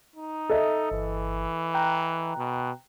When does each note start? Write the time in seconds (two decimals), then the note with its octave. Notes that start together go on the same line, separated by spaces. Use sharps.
0.16 D#4
0.50 A4 D#5 E5
0.91 G1 E3
1.74 G5 A#5 F#6
2.37 B2